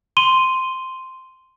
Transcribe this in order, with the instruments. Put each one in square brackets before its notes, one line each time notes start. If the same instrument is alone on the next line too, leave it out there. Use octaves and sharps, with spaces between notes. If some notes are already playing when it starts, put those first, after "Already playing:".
[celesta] C6 D#7 G7